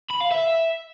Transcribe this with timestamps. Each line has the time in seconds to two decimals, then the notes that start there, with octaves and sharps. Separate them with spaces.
0.10 B5
0.20 F5
0.31 E5